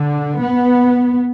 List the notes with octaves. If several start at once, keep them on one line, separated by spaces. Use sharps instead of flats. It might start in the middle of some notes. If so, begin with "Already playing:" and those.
Already playing: D3
B3